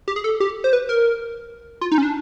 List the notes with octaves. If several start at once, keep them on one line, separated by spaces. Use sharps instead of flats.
G4
G#4
A4
G4
C5
B4
A#4
F4
D#4
C#4
D4